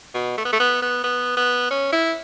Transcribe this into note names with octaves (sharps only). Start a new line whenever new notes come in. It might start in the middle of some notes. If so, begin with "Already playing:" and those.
B2
A3
B3
A3
B3
B3
B3
B3
C#4
E4